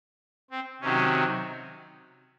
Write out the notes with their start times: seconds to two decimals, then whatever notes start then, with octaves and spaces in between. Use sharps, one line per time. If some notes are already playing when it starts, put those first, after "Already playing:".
0.51 C4
0.81 C3 D#3 F#3 C#4